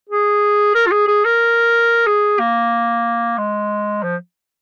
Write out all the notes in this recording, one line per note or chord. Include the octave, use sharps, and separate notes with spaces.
G#4
A#4
F4
G#4
G#4
A#4
G#4
A#3
G#3
F3